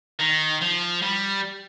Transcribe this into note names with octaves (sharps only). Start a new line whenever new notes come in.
D#3
F3
G3